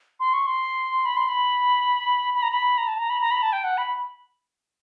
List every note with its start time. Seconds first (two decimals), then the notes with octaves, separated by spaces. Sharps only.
0.20 C6
0.33 C#6
0.46 C6
1.05 B5
1.17 C6
1.28 B5
2.34 B5
2.42 A#5
2.52 B5
2.78 A#5
2.88 A5
2.99 A#5
3.10 B5
3.21 A#5
3.31 B5
3.42 A5
3.53 G5
3.64 F#5
3.77 B5